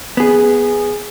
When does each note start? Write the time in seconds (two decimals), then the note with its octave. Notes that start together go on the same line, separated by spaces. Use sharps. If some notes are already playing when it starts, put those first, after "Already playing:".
0.17 B3 G#4